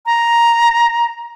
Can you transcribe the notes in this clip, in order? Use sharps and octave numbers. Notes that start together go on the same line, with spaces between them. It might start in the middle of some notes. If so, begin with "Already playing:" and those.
A#5